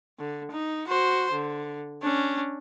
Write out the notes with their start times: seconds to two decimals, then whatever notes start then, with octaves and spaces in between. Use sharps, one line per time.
0.19 D3
0.51 D#4
0.88 F#4 C5
1.32 D3
2.03 C#4 D4